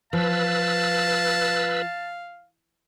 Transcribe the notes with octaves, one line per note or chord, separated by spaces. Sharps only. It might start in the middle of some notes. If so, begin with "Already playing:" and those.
F3 B4 F5 A5 E6